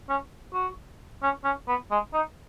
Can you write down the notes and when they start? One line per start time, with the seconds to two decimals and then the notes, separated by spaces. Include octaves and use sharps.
0.09 C#4
0.53 F#4
1.23 C#4
1.44 C#4
1.68 B3
1.91 G#3
2.14 D#4